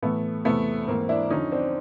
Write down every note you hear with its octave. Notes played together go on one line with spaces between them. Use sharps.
A2 E3 A3 B3
E2 C3 E3 A3 B3
G#2 E3 A#3 C4
D4 E4
F2 D3 F3 C#4 D#4
C4 D4